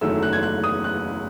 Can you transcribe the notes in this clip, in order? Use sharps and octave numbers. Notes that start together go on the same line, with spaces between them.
F#1 E2 D#3 F#3 A3 E6
F#6
G#6
F#6
D#6
F#6